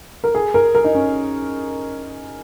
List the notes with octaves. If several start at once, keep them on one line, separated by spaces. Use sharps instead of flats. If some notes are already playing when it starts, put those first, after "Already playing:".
A#4
G#4
A#4
A#4
D#4
C#4